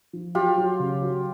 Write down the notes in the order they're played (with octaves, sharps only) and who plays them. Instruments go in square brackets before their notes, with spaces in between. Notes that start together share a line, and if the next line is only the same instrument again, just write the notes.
[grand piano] F3
[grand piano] F#3 [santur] F4 G4
[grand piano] F#3
C#3
F#3